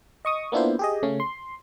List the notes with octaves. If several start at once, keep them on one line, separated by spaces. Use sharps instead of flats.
D#5 C#6 D#6
A#3 B3 D4 E4 F4 C5
G4 G#4 D#5
C#3 A3 C#4
C6